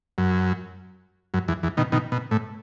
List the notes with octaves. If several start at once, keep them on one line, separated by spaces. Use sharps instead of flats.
F#2
F#2
E2
E2
B2 D#3
B2 D#3
B2
A2